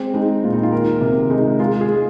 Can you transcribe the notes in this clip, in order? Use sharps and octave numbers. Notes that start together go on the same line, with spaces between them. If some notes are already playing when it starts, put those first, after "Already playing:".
Already playing: G#3 C4
G#3 D#4
A#2 F4
D#4
F4
D#3 A#4
C3 A#4
G#3 D#4
G#3 F4
G#4
G#3